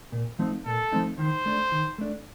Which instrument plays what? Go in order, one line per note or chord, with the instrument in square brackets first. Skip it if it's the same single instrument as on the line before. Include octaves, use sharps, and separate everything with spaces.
[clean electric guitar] A#2
F3 A3 C4 D#4
[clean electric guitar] A#2 [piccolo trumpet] A4
[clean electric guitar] F3 A3 C4 D#4
[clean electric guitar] D#3 [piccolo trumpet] C5
[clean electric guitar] A3 D4
D#3
A3 D4